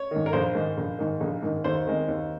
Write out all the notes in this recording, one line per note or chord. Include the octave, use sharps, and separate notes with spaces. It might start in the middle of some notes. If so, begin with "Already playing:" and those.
Already playing: C#5
G#2 D#3
A#4
A#1 C5
G#2 D#3
A#1
G#2 D#3
A#1
G#2 D#3
D#2 C5
D#3 G#3 C4
D#2